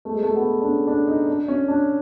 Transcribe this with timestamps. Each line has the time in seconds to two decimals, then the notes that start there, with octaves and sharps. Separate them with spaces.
0.05 A3
0.13 G#3
0.23 A3
0.36 B3
0.61 D4
0.66 C#4
0.87 D4
1.07 D#4
1.28 D4
1.48 C#4
1.68 D4